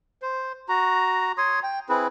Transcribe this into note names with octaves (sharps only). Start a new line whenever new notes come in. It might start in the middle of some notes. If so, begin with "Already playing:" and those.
C5
F#4 A#5
C#5 C6 D#6
G5
C4 E4 G#4 B4